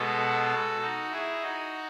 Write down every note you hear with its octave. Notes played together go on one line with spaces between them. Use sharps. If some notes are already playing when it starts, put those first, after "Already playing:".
Already playing: B2 G#3 B3 F#4 A4
D#4 F#4
E4 G#4
D#4 F#4